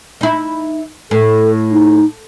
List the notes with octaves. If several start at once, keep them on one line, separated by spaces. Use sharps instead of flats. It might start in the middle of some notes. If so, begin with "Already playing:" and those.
D#4 E4
A2 A4
D#4